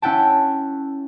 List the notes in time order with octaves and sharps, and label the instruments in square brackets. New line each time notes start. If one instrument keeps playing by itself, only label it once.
[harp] C#4 E4 F#5 G5 A5